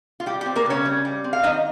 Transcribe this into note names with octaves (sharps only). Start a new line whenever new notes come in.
F4
G3 G4
G4
C4
A#3 A#4
C#3 C#4 C#5
G3
G3
C4
F5
D#3 D#4 D#5